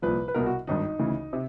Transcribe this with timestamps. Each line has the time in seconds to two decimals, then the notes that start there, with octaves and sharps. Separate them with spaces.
0.02 C2 A#2 F3 B4
0.28 B4
0.34 C2 B2 A#4
0.46 F#4
0.67 G#1 G2 D#3 D#4
0.99 D2 C#3 E3
1.33 C3